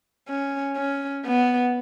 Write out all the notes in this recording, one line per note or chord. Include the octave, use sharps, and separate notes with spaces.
C#4
C#4
B3